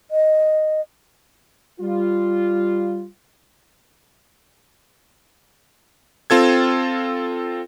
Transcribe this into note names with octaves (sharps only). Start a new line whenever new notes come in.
D#5
G3 F4
C4 F4 A4 G#6